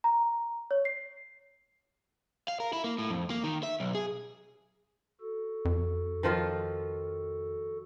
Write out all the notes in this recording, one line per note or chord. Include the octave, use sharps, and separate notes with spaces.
A#5
C#5
C7
F5
A#4
E4
A#3
A2
F2
A#3
D#3
E5
B1
G#4
F#4 A4
F2
D#3 F3 F4